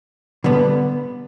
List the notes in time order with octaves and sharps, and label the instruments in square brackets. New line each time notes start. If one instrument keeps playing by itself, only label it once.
[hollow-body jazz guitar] D3 G3 B3